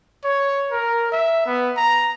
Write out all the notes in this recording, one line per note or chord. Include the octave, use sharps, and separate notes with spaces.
C#5
A#4
E5
B3
A#5